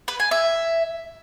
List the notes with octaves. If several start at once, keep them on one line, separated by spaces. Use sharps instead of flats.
B4
G#5
E5